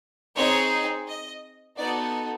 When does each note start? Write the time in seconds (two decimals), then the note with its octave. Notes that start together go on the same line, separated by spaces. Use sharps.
0.36 C4 D#4 G#4 C#5
1.07 D#5
1.77 B3 D#4 F#4 A4 D5